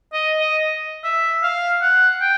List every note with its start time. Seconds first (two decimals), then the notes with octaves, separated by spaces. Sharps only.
0.13 D#5
0.40 D#5
1.04 E5
1.43 F5
1.82 F#5
2.21 G5